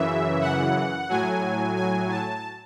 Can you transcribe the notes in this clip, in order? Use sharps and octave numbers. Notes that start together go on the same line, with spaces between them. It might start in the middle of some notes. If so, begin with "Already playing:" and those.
Already playing: F#2 C#3 E3 E5
F#5
A2 F#3 G#5
G#5
A5